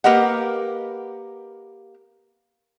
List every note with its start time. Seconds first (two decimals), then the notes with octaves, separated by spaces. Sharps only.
0.04 A#3 G4 A#4 B4 D#5 F#5